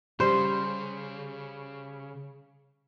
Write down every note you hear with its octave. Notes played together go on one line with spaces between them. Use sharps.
C#3 G3 C5